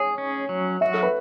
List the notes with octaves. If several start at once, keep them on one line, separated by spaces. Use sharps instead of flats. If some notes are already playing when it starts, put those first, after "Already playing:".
Already playing: G#4 C#5
C#4
F#3
F#4 E5
A4
B4